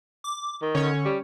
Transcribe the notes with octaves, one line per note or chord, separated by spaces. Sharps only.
D6
D#3
D3 C#4 C#5
G3